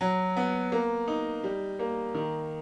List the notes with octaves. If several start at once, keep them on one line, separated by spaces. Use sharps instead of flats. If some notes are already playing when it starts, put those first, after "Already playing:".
F#3
B3
A#3
D#4
G3
A#3
D#3